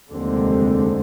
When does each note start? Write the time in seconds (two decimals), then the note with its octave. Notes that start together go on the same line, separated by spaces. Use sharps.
0.11 F1 D#2 D3 G#3 C4